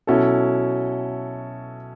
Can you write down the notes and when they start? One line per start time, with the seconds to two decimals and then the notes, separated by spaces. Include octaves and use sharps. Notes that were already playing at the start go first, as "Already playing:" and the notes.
0.07 B2 F#3 C#4 E4 A4